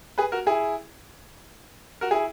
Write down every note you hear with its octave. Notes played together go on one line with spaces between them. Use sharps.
G#4 B4
F#4 A#4
E4 G#4
F#4 A#4
E4 G#4